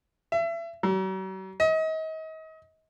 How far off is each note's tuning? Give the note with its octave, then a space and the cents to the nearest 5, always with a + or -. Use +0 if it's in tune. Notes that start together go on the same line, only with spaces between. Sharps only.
E5 +30
F#3 +45
D#5 +35